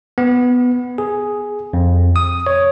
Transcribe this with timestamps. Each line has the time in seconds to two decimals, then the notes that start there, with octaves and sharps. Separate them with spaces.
0.18 B3
0.98 G#4
1.73 F2
2.16 D#6
2.47 C#5